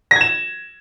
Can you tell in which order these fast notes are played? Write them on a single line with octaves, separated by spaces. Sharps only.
A#6 G#6 E7